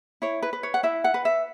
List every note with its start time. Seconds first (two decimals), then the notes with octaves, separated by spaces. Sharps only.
0.22 E4 C#5
0.43 B4
0.53 B4
0.63 C#5
0.74 F#5
0.83 E4 E5
1.04 F#5
1.14 B4
1.25 E5